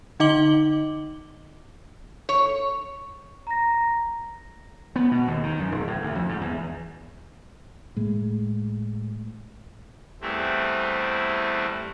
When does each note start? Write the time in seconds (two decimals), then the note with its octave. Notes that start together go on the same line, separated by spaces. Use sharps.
0.20 D3 D#4 D#5 D6 F#7 G7
2.29 C#5
3.47 A#5 A#6
4.96 B3
5.11 B2
5.28 D#2
5.44 D#3
5.59 F#2
5.72 E1
5.87 A2
6.02 D2
6.15 F2
6.29 G#2
6.41 E2
7.96 A2 G#3
10.21 E2 E3 G3 A3 C4